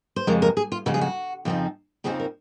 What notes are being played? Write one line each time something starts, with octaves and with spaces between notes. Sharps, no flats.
C5
F2 C#3 G#3 A#4
A#4
G#4
F4
F2 C#3 G#3 F#4
G#4
F#4
F2 C#3 F3 C4 D#4
F2 C#3 F3 C4 D#4 G#4
A#4